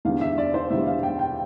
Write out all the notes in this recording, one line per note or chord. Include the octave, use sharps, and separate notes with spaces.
E2 D3 G3 F5
E5
D5
C5
E2 D3 G3 E5
F5
G5
G5